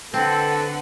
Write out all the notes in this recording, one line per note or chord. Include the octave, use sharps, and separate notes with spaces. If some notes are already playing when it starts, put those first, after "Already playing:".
D3 C4 A4 B4 F#5